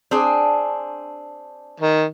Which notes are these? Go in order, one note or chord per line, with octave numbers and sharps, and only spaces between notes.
C4 D4 G#4
D#3